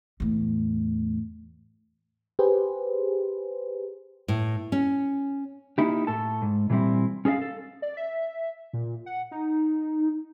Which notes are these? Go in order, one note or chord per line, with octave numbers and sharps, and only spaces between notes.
E2 A2
G4 G#4 B4 C5
A2
C#4
A#3 D#4 E4 G4
A2 A4 A5
G#2
A#2 E3 G3 C4 E4
C#4 G#4 A4 D#5 F5
A4
D5
E5
A#2
F#5
D#4